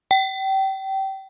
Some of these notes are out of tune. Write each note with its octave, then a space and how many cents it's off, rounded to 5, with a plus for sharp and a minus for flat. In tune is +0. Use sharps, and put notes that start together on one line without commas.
G5 -30